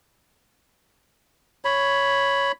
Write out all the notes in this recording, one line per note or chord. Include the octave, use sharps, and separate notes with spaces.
C#5 B5